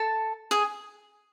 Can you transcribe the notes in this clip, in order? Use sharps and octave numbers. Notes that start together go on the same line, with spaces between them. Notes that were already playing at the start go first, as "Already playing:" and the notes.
Already playing: A4 A5
G#4 G#5